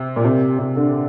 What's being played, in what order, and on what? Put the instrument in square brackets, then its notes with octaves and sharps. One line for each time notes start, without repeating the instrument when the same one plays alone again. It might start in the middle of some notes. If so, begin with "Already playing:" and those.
Already playing: [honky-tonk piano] C3
A#2
C3
C3
D3